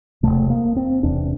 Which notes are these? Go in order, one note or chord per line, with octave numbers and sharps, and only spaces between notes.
E1 E2 C3 A3
A#3
C4
E1 E2 C3 D4